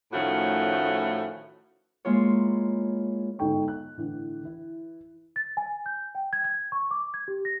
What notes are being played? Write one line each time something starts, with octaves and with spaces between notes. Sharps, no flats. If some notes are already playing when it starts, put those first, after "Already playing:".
A2 D#3 F3 A3 C#4 F#4
G#3 A#3 E4 F4 C#5
G1 G#2 D#4 A4 G5 C#6
F#6
A2 D3 E3
E3 E4
A6
G#5
G6
G5
G#6
G#6
C#6
D6
G#6
G4
A#6